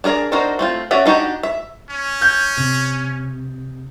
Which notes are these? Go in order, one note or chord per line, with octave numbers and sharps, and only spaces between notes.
D4 G#4 A#4 D5
D4 D#4 F#4 A#4 C5
A3 C4 F4
C#4 F#4 D5 E5
D4 D#4 F#4 G4
E5
C#4
G6
C3